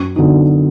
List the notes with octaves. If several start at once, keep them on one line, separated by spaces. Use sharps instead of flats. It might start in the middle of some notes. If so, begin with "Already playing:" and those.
Already playing: F#2
D3 F#3 B3 D#4